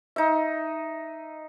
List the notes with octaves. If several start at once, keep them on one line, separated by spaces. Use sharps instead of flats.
D#4 E5